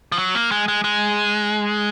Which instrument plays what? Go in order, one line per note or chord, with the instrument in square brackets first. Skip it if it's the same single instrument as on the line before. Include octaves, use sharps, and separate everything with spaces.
[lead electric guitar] F3
F#3
A#3
G#3
G#3
G#3